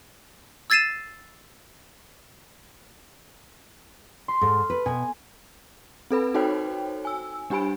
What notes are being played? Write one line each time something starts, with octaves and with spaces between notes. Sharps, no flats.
E6 G#6 A6 C7 D#7 E7
C6 B6
G#2 A4 F6
B4
B2 G#5
C4 A4 B4 B5
D#4 F#4 A4 C5 C#5 G5
G#5 E6
G3 D4 G4 G#5 B5 D7